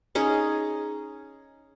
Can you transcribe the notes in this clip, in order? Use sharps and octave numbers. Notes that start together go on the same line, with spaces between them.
C#4 D#4 G#4